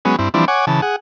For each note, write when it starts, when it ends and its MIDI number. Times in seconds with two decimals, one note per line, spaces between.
0.05 0.16 54
0.05 0.16 56
0.05 0.16 59
0.05 0.16 61
0.19 0.29 43
0.19 0.29 60
0.19 0.29 64
0.34 0.45 52
0.34 0.45 53
0.34 0.45 55
0.34 0.45 60
0.34 0.45 62
0.34 0.45 64
0.48 0.65 73
0.48 0.65 78
0.48 0.65 80
0.48 0.65 86
0.67 0.81 49
0.67 0.81 52
0.67 0.81 81
0.82 0.96 68
0.82 0.96 78